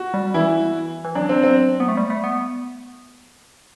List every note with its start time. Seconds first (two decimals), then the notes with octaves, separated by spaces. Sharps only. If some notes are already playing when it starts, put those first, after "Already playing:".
Already playing: F#4
0.14 G3
0.34 E3 E4
1.05 E3
1.15 F#3 D4
1.29 C4
1.43 C4
1.80 B3
1.88 A3
1.97 G3
2.10 A3
2.24 B3